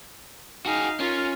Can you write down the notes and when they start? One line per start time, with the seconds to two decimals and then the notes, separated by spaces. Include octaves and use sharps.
0.66 D#4 F#4 G#4 F5
1.00 C#4 F4 A#4